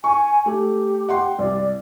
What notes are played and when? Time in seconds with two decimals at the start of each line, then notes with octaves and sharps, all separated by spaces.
0.04 G#5 C#6
0.46 A3 G4
1.09 F#5 G5 C6
1.39 C2 D5